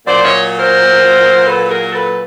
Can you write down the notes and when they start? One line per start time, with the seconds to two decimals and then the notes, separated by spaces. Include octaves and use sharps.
0.06 A#2 F#3 C5 D5
0.23 C#5 D#5
0.58 A#4 C5
1.46 A4 B4
1.69 G#4 A#4
1.92 A4 B4